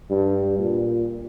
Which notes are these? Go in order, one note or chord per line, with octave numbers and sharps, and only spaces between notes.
G2
A#2